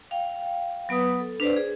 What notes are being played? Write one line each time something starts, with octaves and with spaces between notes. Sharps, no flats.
F5 G5
F#3 B3 B4 D#6
A4
D4 B4 C5 D5
G#4